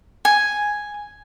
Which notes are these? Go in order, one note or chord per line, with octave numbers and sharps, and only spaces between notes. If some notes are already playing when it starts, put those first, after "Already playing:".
G#5